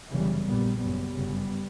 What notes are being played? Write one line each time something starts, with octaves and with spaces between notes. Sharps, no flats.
G1 F#2 C#3 E3 G3
A#1 A#2 G3 B3
F#1 F#2 C#3 G3 B3
G1 F#2 C#3